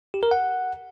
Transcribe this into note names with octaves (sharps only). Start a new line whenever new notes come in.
G4
A#4
F#5